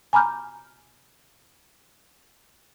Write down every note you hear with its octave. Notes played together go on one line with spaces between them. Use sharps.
G#5 A#5 B5 D6 F6 G6